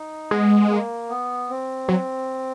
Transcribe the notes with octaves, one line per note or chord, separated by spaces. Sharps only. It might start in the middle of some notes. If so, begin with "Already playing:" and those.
Already playing: D#4
G#3 B3
A#3
B3
C4
F#3